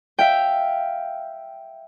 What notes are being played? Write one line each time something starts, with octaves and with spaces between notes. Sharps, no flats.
E5 F5 G5